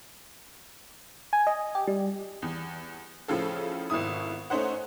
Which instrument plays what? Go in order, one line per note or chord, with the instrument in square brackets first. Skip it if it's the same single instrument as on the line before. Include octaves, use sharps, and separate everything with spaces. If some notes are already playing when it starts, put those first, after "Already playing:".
[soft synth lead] G#5
D#5
G4
G3
[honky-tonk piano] E2
A2 C#3 F3 F4 A4
G#1 B2 E4 D#6
A3 C#4 D#4 C5 F#5